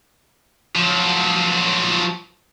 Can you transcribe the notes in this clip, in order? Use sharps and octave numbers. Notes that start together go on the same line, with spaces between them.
F3 F#3